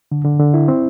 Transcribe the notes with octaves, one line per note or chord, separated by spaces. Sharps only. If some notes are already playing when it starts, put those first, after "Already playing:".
D3
D3
D3
E4
C4